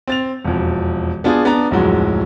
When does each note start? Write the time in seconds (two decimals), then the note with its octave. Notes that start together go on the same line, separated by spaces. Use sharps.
0.07 C4 A6 F7
0.45 E1 F2
1.24 B3 D4 F4 G#4
1.45 B3 D4 A#5
1.71 D1 F2 F#3 G#3 F#4